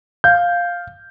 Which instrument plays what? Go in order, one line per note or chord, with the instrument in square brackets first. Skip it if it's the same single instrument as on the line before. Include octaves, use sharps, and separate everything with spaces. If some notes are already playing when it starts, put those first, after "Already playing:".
[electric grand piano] F5 G6